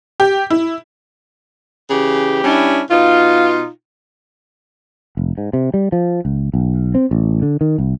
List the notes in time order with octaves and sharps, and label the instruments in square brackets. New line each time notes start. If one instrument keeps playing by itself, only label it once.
[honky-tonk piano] G4
E4
[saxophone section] C#3 E3 G4
G3 C#4 D4 E4
B2 D#4 F4
[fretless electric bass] F1
G#2
C3
G3
F3
C#2
B1
C4
A1
D3
D#3
C2